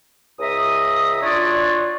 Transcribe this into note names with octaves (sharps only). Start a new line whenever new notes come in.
C#2 E5 A#5 D#6
D4 F4 F#4 C#5 D5